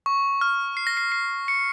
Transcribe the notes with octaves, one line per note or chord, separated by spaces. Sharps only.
C#6
F6
C7
A#6
C7
C7
C#7